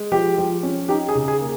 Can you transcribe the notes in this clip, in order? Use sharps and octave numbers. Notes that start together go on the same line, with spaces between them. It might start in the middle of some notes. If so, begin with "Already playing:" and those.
Already playing: G#3
F3 G4
F3
C#4
D#4 G4
G#4
C#3
G#4
A#3